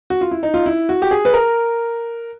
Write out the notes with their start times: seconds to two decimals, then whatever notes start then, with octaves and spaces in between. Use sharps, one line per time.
0.10 F#4
0.21 F4
0.31 E4
0.43 D#4
0.54 F4
0.66 E4
0.89 F#4
1.02 G4
1.11 G#4
1.25 B4
1.34 A#4